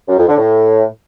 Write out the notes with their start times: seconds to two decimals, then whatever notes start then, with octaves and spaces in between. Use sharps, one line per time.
0.09 F#2
0.18 F2
0.28 D3
0.38 A2